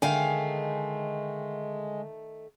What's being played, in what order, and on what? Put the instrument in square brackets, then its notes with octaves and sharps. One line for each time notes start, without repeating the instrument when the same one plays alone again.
[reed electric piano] D3 [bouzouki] D#3 A3 [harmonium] G#3 [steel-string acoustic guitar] F5 G5 G#5